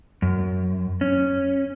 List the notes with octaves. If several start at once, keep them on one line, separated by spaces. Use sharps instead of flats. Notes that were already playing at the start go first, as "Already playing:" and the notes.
F#2
C#4